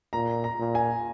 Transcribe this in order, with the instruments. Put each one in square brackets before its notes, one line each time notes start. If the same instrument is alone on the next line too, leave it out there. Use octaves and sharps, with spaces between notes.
[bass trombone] A#2 [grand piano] A#5
[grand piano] A#5
[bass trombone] A#2
[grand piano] G#5